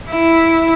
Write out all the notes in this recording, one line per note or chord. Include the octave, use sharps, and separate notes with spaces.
E4